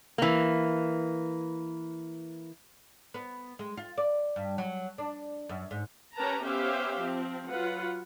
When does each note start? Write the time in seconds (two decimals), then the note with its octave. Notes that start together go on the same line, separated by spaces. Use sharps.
0.18 E3 A#3
3.14 B3
3.59 G#3
3.77 F4
3.98 D5
4.36 G2
4.58 F#3
4.98 D4
5.49 F#2
5.71 G#2
6.16 C#4 G4 A#4 B4 A5 A#5
6.44 B3 C#4 G4 C5 E5 F5
7.02 F3 C4
7.50 F#3 F4 B4 F#5